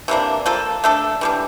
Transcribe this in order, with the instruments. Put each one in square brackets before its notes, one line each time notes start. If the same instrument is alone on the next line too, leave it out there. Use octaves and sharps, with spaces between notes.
[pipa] C3 E3 A#3 D4
F3 A#3 F4 A4
A3 D4 A4
E3 G3 D4